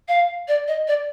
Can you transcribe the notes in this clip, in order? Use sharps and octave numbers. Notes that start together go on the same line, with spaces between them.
F5
D5
D#5
D5